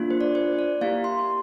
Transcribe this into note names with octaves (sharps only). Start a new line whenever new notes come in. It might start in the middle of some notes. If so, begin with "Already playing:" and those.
Already playing: A#3 D4 F4
C5
D5
C5
D5
A#3 E4 G4 F5
C6
C6